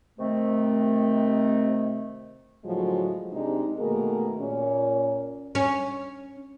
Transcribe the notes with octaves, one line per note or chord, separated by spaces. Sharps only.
C3 D#3 A3 C4
A2 D3 F3 F#3 G#3 F#4
C3 G#3 D4 D#4
B2 D#3 A3 A#3 G#4 A#4
A#2 C#4
C#4